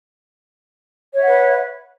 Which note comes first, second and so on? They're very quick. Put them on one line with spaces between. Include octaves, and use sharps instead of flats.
C#5 E5 F#5 B4